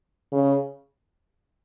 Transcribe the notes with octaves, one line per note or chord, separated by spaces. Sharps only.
C#3